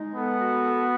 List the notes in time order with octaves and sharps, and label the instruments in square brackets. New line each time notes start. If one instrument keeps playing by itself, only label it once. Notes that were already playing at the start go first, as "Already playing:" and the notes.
Already playing: [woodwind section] G#3 D#4
[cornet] B3 [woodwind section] A4
[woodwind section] F#4
A4